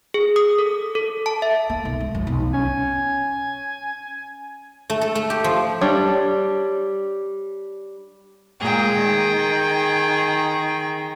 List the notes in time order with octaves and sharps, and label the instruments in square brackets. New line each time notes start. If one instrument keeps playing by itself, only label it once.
[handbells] G#4
D#6
A4
A4
A5
E5
[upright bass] A#3
B1
G#2
F2
B1
[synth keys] C#4 [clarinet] G#5
[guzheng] A3
A4
A3
G4
F3
[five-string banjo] G3 D4 C#5
[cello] A#2 G#3 [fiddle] G#4 G5
[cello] D#3